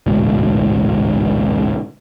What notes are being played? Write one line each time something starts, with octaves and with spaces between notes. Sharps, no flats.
A1 D2 G#2 B2